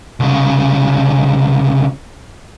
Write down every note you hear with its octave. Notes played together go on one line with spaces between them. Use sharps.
C2 C#3